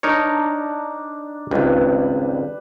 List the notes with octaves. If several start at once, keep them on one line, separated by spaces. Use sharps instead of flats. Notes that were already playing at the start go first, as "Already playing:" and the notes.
D4 D#4 A#4 C#5
G#1 C#2 G3 B4